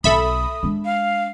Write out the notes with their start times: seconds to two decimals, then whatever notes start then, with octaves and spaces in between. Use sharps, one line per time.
0.04 B1 A4 E5 B5 D#6
0.63 G#3 D4
0.85 F5